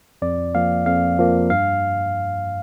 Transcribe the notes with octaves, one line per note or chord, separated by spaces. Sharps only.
F2 D5
F3 A#3 F5
F2 F5
F3 A#3
G2 F5